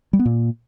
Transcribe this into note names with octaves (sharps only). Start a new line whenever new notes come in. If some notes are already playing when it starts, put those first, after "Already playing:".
G3
B3
A#2